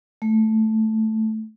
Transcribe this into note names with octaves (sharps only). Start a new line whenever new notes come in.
A3